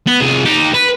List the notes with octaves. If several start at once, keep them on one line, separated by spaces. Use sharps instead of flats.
B3
C2 G#4
D#4 G4
B4